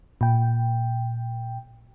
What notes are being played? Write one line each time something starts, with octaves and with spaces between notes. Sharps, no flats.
A#2 G5